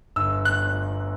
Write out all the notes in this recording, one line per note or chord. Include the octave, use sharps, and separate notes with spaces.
G1 E6
F#6